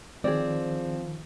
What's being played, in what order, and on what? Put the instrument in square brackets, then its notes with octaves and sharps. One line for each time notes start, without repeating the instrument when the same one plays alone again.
[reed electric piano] D#3 [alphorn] F3 [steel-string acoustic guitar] C4 [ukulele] G#4 D5